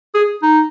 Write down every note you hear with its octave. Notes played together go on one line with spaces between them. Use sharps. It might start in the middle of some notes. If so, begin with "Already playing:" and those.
G#4
D#4